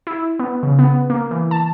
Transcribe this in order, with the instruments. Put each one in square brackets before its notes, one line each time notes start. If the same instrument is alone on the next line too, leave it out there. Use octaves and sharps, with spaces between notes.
[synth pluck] E4
B3
C#3
B3
A#3
E3
A5